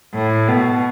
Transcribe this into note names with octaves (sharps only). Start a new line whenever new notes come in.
A2
B2